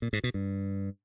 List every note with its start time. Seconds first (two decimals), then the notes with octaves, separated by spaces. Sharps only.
0.02 A#2
0.13 G#2
0.24 B2
0.34 G2